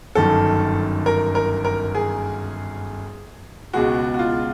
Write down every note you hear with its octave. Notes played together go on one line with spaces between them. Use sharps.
G1 F#2 D#3 A4
A#4
A#4
A#4
G#4
C#2 B2 G#3 F#4
F#4
F4